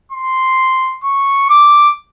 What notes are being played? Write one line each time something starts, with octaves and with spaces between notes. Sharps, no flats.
C6
C#6
D6